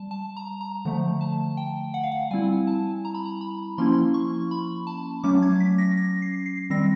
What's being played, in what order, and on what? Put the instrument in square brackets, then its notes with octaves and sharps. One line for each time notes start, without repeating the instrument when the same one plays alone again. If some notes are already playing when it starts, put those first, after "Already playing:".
Already playing: [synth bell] G3 A5
A5
A#5
A#5
D3 F3 A3 A#5
A5
G5
F#5
F5
F#5
G3 C4 E4 G#5
A5
A#5
B5
A#5
B5
F3 A#3 C#4 E4 C6
C#6
B5
A5
F#3 A3 C#4 D6
G#6
B6
A#6
A#6
C7
C7
D#3 G3 C4 A#6